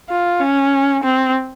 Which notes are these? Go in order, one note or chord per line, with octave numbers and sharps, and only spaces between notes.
F4
C#4
C4